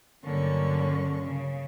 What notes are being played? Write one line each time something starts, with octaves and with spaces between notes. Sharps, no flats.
G2 D3 F#3 A#3 C#4 C#6
C#3